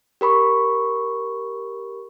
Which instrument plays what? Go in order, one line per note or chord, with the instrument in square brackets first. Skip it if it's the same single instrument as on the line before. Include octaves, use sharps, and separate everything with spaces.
[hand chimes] G4 A#4 B5 C#6